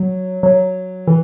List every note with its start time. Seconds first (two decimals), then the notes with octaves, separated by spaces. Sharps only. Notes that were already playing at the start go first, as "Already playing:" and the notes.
Already playing: F#3
0.43 F#3
1.07 E3